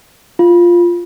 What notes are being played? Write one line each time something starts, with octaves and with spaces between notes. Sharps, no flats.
F4